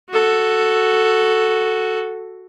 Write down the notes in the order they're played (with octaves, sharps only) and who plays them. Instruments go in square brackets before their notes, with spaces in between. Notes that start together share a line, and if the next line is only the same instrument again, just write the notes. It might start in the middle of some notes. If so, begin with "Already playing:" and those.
[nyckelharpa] F#4 A4